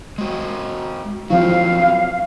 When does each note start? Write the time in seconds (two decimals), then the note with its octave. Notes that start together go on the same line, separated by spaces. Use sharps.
0.18 G#3 F#4
1.30 F3 F#3 C4 E4 F5